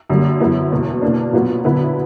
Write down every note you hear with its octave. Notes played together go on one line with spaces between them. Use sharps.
F#2 D3 G3 A#3
F#2 E3 B3 E4
F#1 E2 B2
B2 A#3 D4
A#2 F#3 B3 F#4
D3 F#3 B3 E4 B4